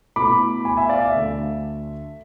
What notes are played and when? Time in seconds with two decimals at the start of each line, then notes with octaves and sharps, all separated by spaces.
0.16 B2 A3 E4 B5 D6
0.65 G#5 B5
0.77 E5 G#5
0.89 D5 F5
1.01 E5
1.14 D2 D3 A3